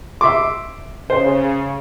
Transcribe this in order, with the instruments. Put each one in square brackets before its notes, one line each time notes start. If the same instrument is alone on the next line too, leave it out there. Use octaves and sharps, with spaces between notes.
[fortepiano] E5 C6 D6
[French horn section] C#3 [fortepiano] C5